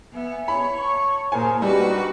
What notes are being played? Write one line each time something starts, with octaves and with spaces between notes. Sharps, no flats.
B3 E5 G#5
C#5 B5
A5 C#6
A#2 A#3 G#4 A#4 C5 G#5
G3 D4 D#4 F#4 G4 B4